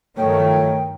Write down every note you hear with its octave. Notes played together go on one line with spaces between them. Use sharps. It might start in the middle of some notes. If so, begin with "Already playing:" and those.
G2 D#3 F3 F#3 A3 C#5 G5